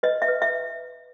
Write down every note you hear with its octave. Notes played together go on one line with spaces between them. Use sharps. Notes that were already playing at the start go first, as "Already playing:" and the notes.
B4 D#5
E5
B4
E5